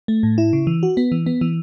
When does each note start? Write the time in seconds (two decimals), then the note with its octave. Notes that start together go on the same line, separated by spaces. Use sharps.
0.08 A3
0.23 A2
0.38 E4
0.53 C#3
0.67 E3
0.83 F#4
0.97 B3
1.12 E3
1.26 B3
1.41 E3